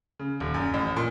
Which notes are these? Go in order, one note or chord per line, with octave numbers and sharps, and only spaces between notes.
C#3
D#1
F#2
A1
A#2